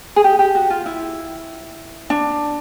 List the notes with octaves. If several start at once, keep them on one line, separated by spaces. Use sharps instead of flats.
G#4
G4
G4
F#4
F4
E4
D4